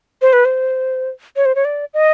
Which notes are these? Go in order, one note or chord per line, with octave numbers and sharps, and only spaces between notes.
C5
B4
C5
C#5
C5
C#5
D5
D#5